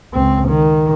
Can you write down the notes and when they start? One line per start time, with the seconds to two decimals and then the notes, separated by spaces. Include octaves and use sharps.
0.14 C#2 C4
0.48 D#3